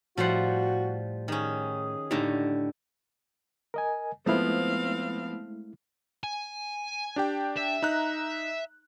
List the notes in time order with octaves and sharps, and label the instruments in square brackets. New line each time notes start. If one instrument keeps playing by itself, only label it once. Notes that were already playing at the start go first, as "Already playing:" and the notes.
[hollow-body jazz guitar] A2 C5 [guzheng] F3 G3 F#5 [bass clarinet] F#4
[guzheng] D#3 C#4 [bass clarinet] G#4
[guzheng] A2 D3 [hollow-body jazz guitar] D#4 G4
[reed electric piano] A#4 D#5 G#5
[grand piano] F3 B3 [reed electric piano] G#3 A3 E4 [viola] C4 F5
[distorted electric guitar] G#5
[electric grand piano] D4 G4 G5
[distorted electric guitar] E5
[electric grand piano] D#4 A#5 F#6